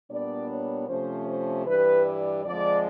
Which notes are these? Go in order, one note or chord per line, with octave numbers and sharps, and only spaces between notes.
A#2 G3 B3 D4 D5
C#5
C3 F3 A3 C#4 C5
C5
G2 E3 G3 B4
D5
F2 D3 F3 G#3 D5